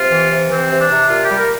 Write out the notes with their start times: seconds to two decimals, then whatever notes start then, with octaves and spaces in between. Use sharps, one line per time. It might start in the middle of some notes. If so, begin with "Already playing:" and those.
Already playing: C3 F4
0.12 E3
0.32 C3
0.51 E3 C4
0.71 C3
0.80 D4
0.90 C3
1.09 A#2 F4
1.24 G4
1.30 G3
1.38 A#4